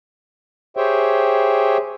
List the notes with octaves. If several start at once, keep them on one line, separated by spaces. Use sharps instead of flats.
G4 G#4 C5 C#5 E5 G5